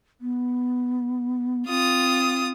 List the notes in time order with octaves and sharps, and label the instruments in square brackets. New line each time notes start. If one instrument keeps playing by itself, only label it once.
[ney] B3
[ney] C4 [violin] F4 D#6